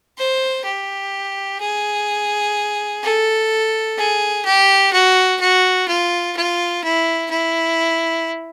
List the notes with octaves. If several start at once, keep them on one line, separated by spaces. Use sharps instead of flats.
C5
G4
G#4
A4
G#4
G4
F#4
F#4
F4
F4
E4
E4